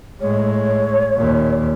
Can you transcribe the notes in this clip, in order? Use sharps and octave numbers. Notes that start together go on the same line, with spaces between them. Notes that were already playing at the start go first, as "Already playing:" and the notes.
A2 G#3 C#5
D#2 A#2